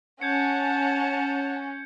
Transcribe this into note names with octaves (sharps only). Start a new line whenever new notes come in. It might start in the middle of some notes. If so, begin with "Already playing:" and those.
C#4 F#5 A5 G6 G#6 C#7